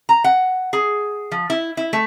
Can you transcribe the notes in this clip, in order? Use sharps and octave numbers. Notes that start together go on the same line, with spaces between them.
A#5
F#5
G#4
F3
E4
E4
A3